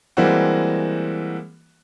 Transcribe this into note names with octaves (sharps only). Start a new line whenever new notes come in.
E3 G3 G#3 A#3 C4 F#4